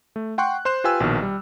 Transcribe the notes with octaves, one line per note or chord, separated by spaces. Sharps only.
A3
F#5 G5 C6 C#6 F#6
C5 C6 F#6 E7
F4 G4 B4 G5 G#5 E6
A#1 B2 D#3 F6
G3